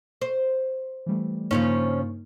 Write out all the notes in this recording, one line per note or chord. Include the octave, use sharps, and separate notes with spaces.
C5
E3 G3 A3
G2 C#3 F3 A#3 C#4 D#4